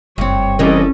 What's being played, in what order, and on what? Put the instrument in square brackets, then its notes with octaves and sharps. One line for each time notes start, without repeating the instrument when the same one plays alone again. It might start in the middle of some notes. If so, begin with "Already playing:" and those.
[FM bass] F#1 [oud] G2 C4 [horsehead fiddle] C#5
[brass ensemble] C2 D5 D#5 [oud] E3 A#4 [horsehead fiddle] C#4 A4